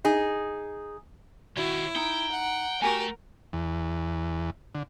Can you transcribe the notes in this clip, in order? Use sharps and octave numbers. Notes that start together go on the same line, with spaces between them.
D#4 G#4
D#3 C#4 E4 F#4
D#4 G5 A#5
F#5
A3 F#4 G4 A#4 G#5
E2
D3